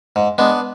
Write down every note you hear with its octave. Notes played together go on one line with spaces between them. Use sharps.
G#2
G#3 B3 D4